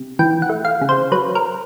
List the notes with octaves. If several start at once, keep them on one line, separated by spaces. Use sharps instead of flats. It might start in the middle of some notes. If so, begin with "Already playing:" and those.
Already playing: C3
E3 G5
F#5
A3
F5
C#3
C5
F#3 B4
A#4